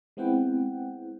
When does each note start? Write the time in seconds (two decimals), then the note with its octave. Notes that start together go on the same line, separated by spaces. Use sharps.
0.17 G#3 B3 C4 E4 F#5 G5